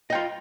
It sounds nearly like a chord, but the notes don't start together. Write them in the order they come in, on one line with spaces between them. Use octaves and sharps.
D#5 G5 F4